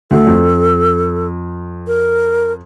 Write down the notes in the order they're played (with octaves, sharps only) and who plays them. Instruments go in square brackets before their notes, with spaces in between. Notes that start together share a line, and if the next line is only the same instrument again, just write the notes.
[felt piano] D2 [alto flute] A4
[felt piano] F2
[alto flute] A#4